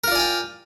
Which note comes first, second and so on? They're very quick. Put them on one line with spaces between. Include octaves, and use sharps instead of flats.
A#4 F4 D5 G#5 G5